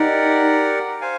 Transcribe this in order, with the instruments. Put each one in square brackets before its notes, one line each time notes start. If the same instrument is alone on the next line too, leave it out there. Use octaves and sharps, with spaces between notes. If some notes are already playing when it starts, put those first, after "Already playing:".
Already playing: [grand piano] D#4 [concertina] G4 A#4 D5 F#5
[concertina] C5 F5 G#5